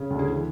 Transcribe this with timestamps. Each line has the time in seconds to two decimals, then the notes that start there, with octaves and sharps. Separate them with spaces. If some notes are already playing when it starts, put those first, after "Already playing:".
Already playing: C#3
0.10 D2
0.19 G#4
0.28 E3